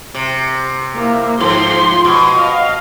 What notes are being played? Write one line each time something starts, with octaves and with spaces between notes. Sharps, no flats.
C3
A#3 E4
G#2 F3 C6
B2
D#5 F5